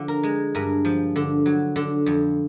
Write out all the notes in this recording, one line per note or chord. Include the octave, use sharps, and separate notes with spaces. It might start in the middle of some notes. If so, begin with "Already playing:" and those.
Already playing: D3 F3
A#4
G#3
G2 A#4
F3
D3
F#3
D3
F2